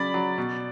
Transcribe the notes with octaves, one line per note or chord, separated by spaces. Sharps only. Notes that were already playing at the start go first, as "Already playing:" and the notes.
Already playing: C#3 F#3 D5 B5
F#3
B2